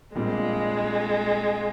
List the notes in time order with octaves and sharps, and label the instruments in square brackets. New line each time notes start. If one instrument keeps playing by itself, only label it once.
[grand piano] A#1 A#2 G3 C4 [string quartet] G#3